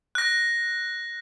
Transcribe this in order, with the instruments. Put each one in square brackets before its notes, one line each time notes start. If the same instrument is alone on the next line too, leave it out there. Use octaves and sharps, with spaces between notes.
[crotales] F#6 A#6